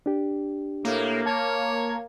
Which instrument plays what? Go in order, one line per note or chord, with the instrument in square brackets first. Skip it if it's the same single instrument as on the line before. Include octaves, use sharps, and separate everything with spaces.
[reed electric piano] D4 G4
[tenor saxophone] A2 [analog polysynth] A#3
[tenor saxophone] C#5 [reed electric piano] A5